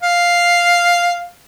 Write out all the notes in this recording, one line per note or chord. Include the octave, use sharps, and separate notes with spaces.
F5